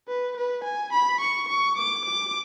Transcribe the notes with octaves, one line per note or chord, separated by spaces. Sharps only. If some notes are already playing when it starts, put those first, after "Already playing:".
B4
B4
G#5
B5
C#6
C#6
D6
D6